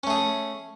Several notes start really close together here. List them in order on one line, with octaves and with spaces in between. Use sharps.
C#4 A3 G#4